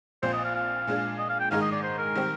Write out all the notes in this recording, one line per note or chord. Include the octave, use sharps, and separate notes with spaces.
A#1 A#2 F3 C4 C5
D#5
F5
F5
A#2 G#3 D4 G#4
D#5
F5
G5
G#2 D#3 G#3 D#4 G#4 F5
D#5
D5
C5
A#4
D#3 G3 C4 G4